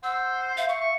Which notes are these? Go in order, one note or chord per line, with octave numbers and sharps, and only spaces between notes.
C5 F#5 E6
E5 F5
F5 C#6
C#6